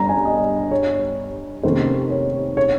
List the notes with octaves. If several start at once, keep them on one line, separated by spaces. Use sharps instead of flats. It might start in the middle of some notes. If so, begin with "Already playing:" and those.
Already playing: G1 G2 G3 A#5
G#5
D#5
C#5
F1 D#2 D#3 A#3 C#4 C5
C#5
C#5